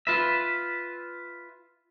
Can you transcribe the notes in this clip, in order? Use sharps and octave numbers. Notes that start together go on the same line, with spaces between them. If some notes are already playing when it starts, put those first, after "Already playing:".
F4 B4 E5